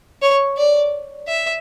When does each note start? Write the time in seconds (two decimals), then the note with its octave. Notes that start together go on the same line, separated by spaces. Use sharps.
0.22 C#5
0.57 D5
1.28 E5